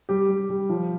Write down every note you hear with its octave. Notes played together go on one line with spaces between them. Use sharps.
G3 G4
G3
G3
F3